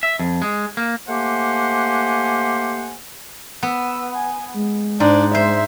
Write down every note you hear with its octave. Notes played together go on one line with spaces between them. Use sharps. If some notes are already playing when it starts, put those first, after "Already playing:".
E5
F2
G#3
A#3
A3 A#3 G4 C5 F#5 G#5
B3 E6
G#5
G#3
G#2 D4
C5 E5